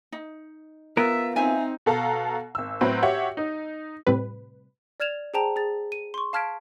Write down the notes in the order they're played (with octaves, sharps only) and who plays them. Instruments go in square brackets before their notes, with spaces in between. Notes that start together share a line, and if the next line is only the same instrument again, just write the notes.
[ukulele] D#4
[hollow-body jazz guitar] B3 F4 A#4 [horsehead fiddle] E5
[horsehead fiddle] C4 D#4 [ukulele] E5 G#5
[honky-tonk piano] B2 A4 F5 A#5
G#1 E6
A2 F#3 C4 B4
F#4 G4 C#5 E5 F#5
D#4
[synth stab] A2 C3 G3 B4
[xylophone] D5 F6 G#6 E7 F7
G#4 C5 G5 A5 A#5 F7
G#4 A6
D#7
C6 C#6
F5 A5 F6 G#6 B6 D7